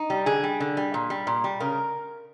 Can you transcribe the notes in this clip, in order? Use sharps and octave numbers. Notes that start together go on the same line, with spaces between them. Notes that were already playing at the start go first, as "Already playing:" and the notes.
Already playing: D#4
G3
D3 G#4
G3
D3
G3
A#2
G3
A#2
G3
C#3 A#4